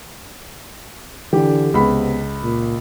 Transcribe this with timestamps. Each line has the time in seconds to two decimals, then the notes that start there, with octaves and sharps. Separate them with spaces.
1.33 D3 E3 G4
1.74 C#2 C3 B3 B5
2.43 A#2